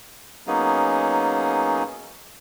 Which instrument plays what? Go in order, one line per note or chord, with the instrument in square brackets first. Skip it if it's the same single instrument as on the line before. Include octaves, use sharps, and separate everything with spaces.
[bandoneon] F#3 A#3 B3 C#4 D#4 G#4